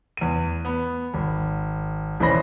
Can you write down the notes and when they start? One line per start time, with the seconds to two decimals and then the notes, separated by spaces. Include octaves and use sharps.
0.17 E2 D#7
0.65 B3
1.14 G#1
2.20 D#1 E3 C#4 C5 B5 A#6